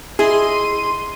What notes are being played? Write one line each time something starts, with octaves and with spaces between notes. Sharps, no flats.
E4 G#4 D#5 C6 D#7